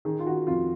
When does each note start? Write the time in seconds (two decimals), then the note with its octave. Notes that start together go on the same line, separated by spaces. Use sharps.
0.05 D#3 G#4
0.19 F4
0.26 D#3 F#4
0.47 F2 F4